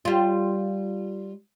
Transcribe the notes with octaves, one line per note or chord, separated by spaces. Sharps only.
G3 F4